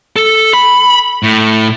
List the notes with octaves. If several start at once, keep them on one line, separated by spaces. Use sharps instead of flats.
A4
B5
A2